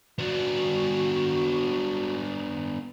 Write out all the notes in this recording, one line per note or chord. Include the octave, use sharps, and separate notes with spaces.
B3 D4 F#4